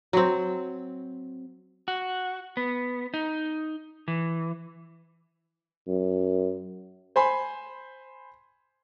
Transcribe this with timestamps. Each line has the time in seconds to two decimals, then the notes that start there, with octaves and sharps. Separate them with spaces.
0.13 F#3 C4
1.88 F#4
2.57 B3
3.14 D#4
4.08 E3
5.87 F#2
7.16 C5 G#5 B5 C6